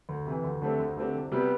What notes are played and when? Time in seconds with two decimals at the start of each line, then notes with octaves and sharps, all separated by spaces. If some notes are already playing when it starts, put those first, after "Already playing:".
0.09 D2
0.26 C3 E3
0.44 D2
0.62 D3 A3 C4 G4
0.79 D2
0.97 D3 A3 C4 G4
1.15 C2
1.32 C3 G3 B3